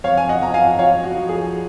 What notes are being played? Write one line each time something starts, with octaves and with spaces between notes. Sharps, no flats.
F2 C#5 F5
G#5
D#5 F#5
F2 A#5
F5 G#5
F3 C#5 F5
F#4
F3
G#4